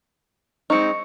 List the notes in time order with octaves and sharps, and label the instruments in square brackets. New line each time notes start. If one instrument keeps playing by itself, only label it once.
[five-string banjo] G#3 C4 D#4 [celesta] C#6 C#7